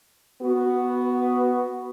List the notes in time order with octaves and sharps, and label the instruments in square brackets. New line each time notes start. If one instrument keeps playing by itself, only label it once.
[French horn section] B3 F#4